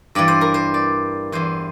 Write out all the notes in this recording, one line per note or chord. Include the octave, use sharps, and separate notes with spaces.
G2 E3 D5
C5
A#4
C5
D5
E2 E3 C5